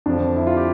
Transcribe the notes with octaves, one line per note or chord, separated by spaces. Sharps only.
F2 D3 F3 D4
E4
F4
G4